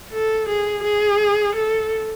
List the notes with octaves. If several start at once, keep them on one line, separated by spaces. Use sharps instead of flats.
A4
G#4
G#4
A4